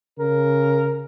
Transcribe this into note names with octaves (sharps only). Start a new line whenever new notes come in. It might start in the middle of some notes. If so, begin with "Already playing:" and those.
C#3 A#4